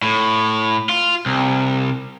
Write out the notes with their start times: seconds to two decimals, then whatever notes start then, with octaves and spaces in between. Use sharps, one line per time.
0.02 A2
0.89 F4
1.26 C2